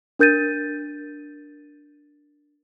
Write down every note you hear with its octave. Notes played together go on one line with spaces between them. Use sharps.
D4 A#4 G6 A6 D#7